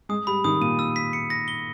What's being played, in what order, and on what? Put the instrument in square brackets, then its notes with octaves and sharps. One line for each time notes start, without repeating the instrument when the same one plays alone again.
[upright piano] G#3 [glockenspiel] D#6
[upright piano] G3 [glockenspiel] B5
[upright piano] D#3 [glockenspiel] D#6
[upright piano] A#2 [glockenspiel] D#7
[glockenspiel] E6
B6
C#7
A#6
G7